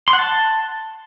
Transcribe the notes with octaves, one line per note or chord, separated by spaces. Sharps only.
C6
F#5
A5